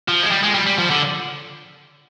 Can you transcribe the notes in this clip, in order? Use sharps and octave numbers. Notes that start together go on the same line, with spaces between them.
F3
G#3
G3
G#3
G3
G3
F3
D3